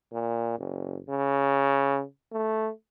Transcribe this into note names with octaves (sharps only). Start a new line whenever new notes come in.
A#2
F#1
C#3
A3